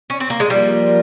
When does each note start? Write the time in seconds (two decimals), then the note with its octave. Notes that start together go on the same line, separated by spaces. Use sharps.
0.10 C#4
0.20 C4
0.30 A#3
0.40 G#3
0.50 F3 G3 A#3 F4 A#4